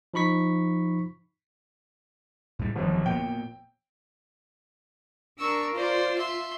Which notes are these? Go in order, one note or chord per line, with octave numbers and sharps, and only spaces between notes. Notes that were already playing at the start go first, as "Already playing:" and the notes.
F3 D#4 B5 C#6 B6
A2 G3
G1 F2 D#3 F#3 G3
A#2 A#3 B3 G5
D4 A#4 C#6 E6
F4 C5 D5
E5 C6